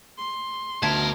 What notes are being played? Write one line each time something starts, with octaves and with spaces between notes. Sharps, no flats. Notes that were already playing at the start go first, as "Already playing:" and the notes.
C6
D2 B2 A#4 E5 A5 G#6